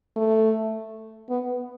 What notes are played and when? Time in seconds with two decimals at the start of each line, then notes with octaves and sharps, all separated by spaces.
0.16 A3
1.30 B3